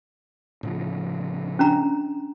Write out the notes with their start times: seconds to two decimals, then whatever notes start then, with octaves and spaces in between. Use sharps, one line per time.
0.63 A2 C#3 F3
1.59 C#4 D4 A#5